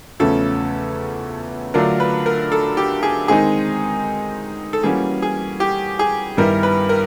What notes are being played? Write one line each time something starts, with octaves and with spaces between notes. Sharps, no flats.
E2 C#3 F3 A3 C#4 A4
D3 F#3 A3 D4 F4 A#4
B4
A#4
A4
G4
G#4
D#3 G#3 C4 D#4 G#4
A4
E3 G3 A#3 C#4 F#4 G#4
G#4
G4
G#4
G2 D#3 G3 B3 E4 A#4
B4
A#4